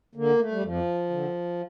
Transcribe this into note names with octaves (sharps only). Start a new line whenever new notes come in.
D3 A#3
A3
G3
F2 F3
D3